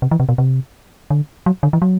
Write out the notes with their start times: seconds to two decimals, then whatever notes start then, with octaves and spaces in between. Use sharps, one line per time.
0.02 C3
0.11 E3
0.20 C3
0.29 B2
0.38 C3
1.10 D3
1.46 F#3
1.63 D3
1.73 E3
1.82 F#3